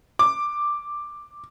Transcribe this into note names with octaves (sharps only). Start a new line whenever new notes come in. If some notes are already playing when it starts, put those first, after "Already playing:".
D6